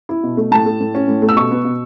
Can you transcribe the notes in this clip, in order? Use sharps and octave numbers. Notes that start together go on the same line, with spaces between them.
E4
B2
A3
A2 A5
A3
A2
C#4
A2
A3
E6
B2 C#6
B3
B2